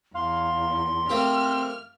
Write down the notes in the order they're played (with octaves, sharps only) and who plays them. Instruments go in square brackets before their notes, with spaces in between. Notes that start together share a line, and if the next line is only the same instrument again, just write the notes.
[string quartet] E2 [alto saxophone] F5 [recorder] C6
[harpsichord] A3 A#3 G4 [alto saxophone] C4 [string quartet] F6